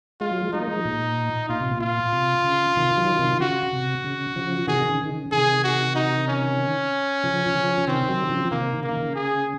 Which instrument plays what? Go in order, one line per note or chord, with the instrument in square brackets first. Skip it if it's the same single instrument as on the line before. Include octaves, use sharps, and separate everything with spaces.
[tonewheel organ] G#3 [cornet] F4
[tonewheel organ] F#3
F3 G#3
[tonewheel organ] G#3 [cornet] D#4
[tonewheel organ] A#3
F3 G#3
A#2
[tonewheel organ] A#2 [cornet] F4
[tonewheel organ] C3
A#2
[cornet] F4
[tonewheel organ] C3
C#3
C3 D#3
D#3 F#3
C3 D#3
[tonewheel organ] C#3 [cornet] F#4
[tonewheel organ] C3
C#3
C#3 F3
[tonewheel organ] C3 D#3 [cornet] G#4
[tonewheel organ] D#3
C#3
D#3
C#3
[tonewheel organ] C3 D#3 [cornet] G#4
[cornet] F#4
D#4
C#4
[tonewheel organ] C#3 F3
C#3 F3
[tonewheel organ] C3 D#3 [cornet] C4
[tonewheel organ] D#3 F#3
C#3 F3
[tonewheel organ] C3 D#3 [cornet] A#3
[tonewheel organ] C#3 [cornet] A#3
[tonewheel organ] D#3
C#3
[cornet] G#4